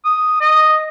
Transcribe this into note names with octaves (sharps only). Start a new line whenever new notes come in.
D#6
D#5